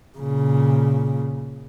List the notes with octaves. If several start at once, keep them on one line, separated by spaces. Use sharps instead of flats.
A#2 C#3